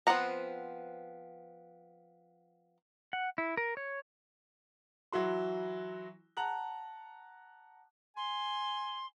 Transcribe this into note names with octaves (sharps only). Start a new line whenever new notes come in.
F3 B3 C4 F#5 A#5
F#5
E4
A#4
C#5
E3 F#3 E4 F#4 C6
F#5 A5 A#5 F#6 F#7
G#5 C6